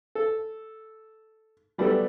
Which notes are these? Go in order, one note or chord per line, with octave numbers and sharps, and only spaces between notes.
A4
F#3 G3 A3 B3 G4 A4